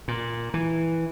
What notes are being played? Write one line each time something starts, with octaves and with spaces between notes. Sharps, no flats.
A#2
E3